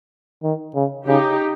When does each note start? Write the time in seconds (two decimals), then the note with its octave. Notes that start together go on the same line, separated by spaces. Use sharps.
0.43 D#3
0.75 C#3
1.07 C#3 D#4 G4